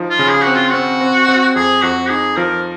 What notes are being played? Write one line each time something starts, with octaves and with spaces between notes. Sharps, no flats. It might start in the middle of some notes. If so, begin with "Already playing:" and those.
Already playing: F3 D#4
F4
C#3
G#4
C4 F#4
F4
C4 F#4
C4
C4
F2 G#4
F2 F#4
D#4 G#4
F3 A#4